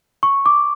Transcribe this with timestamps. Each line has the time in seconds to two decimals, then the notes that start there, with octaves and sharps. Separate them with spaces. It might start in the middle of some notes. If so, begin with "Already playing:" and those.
0.23 C#6
0.46 D6